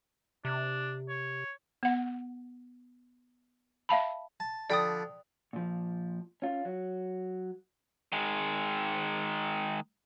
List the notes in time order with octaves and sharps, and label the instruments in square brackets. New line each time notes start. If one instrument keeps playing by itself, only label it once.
[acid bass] C3 [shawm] D4
[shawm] C#5
[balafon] B3 F#5
E5 F5 A5 B5
[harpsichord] A5
[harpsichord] D3 F3 B5 [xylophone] D5 G5 D#6
[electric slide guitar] A#2 F3
C#4 F4
F#3
[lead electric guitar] D#3 G#3